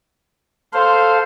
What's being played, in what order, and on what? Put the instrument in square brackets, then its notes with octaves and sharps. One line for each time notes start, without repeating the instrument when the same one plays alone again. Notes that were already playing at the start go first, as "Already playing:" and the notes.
[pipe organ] A4 F5 [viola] C5